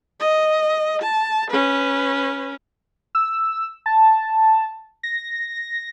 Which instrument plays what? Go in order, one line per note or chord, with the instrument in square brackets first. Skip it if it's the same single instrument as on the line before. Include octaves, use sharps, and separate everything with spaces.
[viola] D#5
A5
C#4 B4
[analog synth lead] E6
A5
A#6